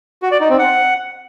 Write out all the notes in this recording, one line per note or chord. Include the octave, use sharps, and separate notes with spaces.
F#4
D5
D#4
C4
F#5